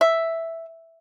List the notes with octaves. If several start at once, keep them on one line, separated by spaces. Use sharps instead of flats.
E5